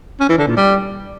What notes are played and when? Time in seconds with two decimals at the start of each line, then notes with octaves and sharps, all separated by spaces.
0.20 C#4
0.29 E3
0.38 D3
0.47 A#2
0.57 G3